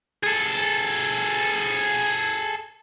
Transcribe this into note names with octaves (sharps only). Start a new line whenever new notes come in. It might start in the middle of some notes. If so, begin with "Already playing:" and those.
G#4 A4